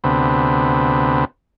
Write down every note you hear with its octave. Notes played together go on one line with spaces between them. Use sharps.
D2 C3 B3